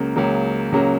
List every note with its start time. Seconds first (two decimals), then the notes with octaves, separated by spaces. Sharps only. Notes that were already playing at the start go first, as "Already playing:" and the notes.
Already playing: C#2 C#3 F#3 A#3
0.16 C#2 C#3 F#3 A#3
0.72 C#2 C#3 F#3 A#3